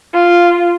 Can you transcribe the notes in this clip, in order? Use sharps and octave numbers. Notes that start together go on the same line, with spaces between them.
F4